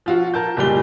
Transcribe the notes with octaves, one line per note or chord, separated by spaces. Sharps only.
F3 F4 F#4
A#4 A5 G6
F#1 A#2 G3 G#3 G7